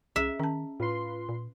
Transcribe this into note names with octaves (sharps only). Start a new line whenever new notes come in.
C2 C#4 G#4 E5
D#3 C#4 A5
A2 F4 B4 C6
A#2